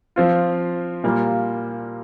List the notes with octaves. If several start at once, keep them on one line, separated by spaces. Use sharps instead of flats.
F3 C4 F4
A#2 G3 A#3 F4